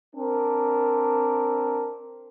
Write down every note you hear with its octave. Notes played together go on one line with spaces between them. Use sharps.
C4 D4 A#4